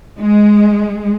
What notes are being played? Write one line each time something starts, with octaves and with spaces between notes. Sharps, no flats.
G#3